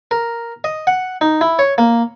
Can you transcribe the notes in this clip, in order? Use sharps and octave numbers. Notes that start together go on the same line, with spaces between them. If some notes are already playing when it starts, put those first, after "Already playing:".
A#4
D#5
F#5
D#4
E4
C#5
A#3